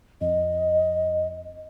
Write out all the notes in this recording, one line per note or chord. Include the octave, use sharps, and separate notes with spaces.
F2 D#5